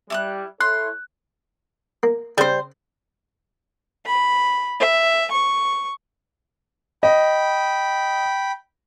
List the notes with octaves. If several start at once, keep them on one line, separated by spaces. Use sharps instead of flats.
G3 E4 D#6 F#6
E4 A4 C#5 C6 F#6
A#3
C#3 G3 C4 C5
B5
E5
C#6
D#5 G5 B5